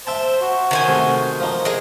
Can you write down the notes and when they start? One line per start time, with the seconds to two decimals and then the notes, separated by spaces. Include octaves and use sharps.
0.07 C5 E5 G5 A5
0.42 F#4
0.71 D#3 C5 G#5
0.88 C3 A3
1.40 F3 D#4
1.65 G#4 D#5